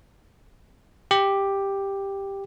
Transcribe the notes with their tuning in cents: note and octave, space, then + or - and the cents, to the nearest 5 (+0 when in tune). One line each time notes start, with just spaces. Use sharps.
G4 +5